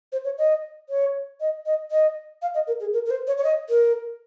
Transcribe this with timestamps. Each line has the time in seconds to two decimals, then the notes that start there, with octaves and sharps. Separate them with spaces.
0.12 C5
0.25 C#5
0.38 D#5
0.89 C#5
1.40 D#5
1.66 D#5
1.91 D#5
2.42 F5
2.54 D#5
2.67 A#4
2.80 G#4
2.93 A#4
3.06 A#4
3.10 C5
3.27 C#5
3.38 C#5
3.44 D#5
3.69 A#4